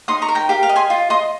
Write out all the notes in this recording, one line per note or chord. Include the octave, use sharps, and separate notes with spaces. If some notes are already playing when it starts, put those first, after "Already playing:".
D#4 C6 D#6
A#5 C#6
A#4
G5 A#5
G4 F5
F5
D#5
G#5 C6
F4
D#5 C6 D#6